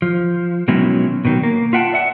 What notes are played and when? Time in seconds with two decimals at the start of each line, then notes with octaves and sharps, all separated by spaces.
0.02 F3
0.68 B2 D#3 F#3 G#3 C#4 E4
1.25 B2 D#3 F#3
1.43 A#3
1.73 F4 E5 F#5 G5 A5
1.93 D5 E5 F#5